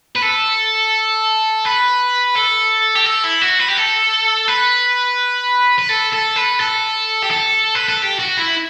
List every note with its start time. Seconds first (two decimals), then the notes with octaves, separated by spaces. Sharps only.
0.16 B4
0.23 A4
1.65 B4
2.35 A4
2.95 G4
3.06 A4
3.24 E4
3.42 F#4
3.59 B4
3.68 G4
3.77 A4
4.48 B4
5.79 B4
5.90 A4
6.13 A4
6.37 B4
6.61 A4
7.23 G4
7.31 A4
7.75 B4
7.89 A4
8.02 G4
8.19 F#4
8.37 E4